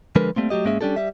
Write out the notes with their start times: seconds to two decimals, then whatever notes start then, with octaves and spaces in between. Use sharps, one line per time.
0.16 D3 F3 G#3 A#4 B4
0.36 G3 A3 A#3 C4
0.50 F#3 A3 G4 D#5
0.65 G#2 G#3 A#3 C#4 G#4 E5
0.81 G3 C#4 D4 G4 A4
0.96 G3 E5